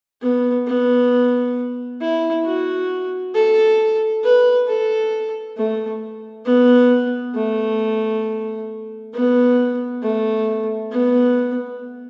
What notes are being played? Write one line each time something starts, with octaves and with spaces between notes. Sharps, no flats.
B3
B3
E4
F#4
A4
B4
A4
A3
B3
A3
B3
A3
B3